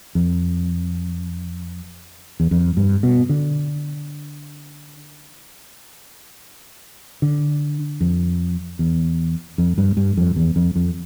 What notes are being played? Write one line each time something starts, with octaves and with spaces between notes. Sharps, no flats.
F2
E2
F2
G2
B2
D3
D3
F2
E2
F2
G2
G2
F2
E2
F2
F2